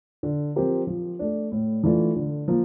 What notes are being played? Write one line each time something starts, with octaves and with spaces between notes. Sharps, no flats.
D3
F3 C4 G4 A#4
F3
A3 D4
A2
E3 A3 D4 F4
D3
F3 A#3